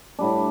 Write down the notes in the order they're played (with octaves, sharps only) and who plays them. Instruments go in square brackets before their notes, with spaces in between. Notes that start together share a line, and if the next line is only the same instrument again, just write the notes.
[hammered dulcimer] A2 G3 D4